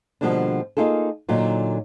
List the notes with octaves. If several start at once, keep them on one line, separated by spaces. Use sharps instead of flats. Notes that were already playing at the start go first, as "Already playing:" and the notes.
B2 D3 F3 G3 A#3 D4
A#3 D#4 F4 G#4 A4
A#2 D3 F#3 D#4 F4